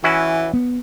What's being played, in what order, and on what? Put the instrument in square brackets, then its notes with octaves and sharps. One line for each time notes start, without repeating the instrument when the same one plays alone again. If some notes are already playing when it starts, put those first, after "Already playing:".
[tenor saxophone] E3 [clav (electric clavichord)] C#4 E4 F#4
[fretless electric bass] B3